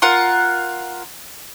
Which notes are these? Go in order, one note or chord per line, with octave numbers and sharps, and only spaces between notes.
F4 A#4 F#5